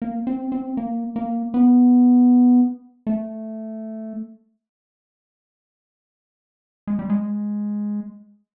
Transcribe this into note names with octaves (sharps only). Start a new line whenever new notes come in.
A#3
C4
C4
A#3
A#3
B3
A3
G#3
G3
G#3